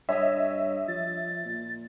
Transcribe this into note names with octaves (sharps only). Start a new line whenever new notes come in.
G2 C#5 D#5 E5
F3 A6
A#2